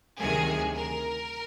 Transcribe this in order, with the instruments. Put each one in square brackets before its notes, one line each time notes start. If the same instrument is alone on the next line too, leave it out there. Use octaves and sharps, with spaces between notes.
[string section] D2 C3 D#3 F#3 G#4
A#4